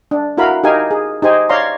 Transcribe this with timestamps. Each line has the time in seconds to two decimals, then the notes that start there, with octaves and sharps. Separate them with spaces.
0.11 D4
0.37 E4 F#4 A#4 F5 B5
0.64 D#4 G4 A#4 F5 G#5
0.91 G#4
1.23 D#4 G4 C5 G#5
1.49 C#5 D5 F5 A#5 C6